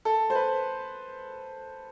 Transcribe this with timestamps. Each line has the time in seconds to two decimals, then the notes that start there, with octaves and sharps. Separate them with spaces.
0.05 A4
0.30 C5
0.35 B4